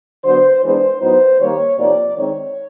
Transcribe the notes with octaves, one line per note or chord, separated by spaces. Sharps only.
D3 F#3 B3 C5
E3 G#3 B3 D4 C5
A2 F#3 B3 D#4 C5
D#3 G3 A#3 C#5
C3 F3 A#3 D#4 D5
D#3 G#3 C4 D#4 C#5